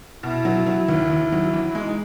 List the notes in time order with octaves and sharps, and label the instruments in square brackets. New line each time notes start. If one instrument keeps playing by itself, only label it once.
[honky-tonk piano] B2 [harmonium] E4
[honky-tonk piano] F#3
F#3
D#2
D#2
F#3
E3
[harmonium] E4
[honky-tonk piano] G#3 [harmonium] D#4